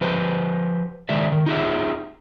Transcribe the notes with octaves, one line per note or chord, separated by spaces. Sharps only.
F3 G4 B4 C5
D#3 G#3 G4 D5 E5
D#3
D#4 F4 G4 G#4 E5